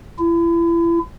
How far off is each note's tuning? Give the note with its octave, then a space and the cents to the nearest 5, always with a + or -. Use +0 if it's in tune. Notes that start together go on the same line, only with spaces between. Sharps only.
E4 +35